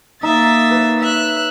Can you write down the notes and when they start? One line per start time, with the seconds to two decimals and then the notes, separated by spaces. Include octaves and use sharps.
0.23 A#3 D#4 E5 A6
0.71 B4 C#5
1.01 E5 F#6